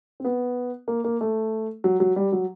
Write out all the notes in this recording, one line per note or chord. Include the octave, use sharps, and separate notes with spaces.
C4
B3
A#3
A#3
A3
F#3
F#3
G3
F#3